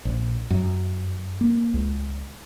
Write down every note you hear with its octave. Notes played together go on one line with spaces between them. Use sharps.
A#1
F#2
A#3
C#2